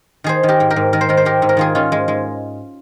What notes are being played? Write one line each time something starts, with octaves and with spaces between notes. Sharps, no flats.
D#3 G#4 C5
D#3
G4 A#4
G#2
G4 A#4
G#2
D#3 A#4
C5
D#3 A#4
C5
G#2 G4 A#4
G#2
A#4
D#3 F4 G#4
D#3 C#4 F4
G#2 G#3
G#2 G#3